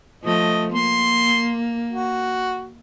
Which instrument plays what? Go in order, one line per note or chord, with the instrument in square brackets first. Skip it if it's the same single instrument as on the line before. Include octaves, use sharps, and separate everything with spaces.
[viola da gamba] F3 A3 [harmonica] D#5
[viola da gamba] A#3 [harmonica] C6
[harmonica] F#4